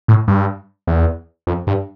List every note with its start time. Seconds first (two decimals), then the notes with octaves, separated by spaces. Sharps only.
0.08 A2
0.28 G2
0.87 E2
1.47 F2
1.67 G2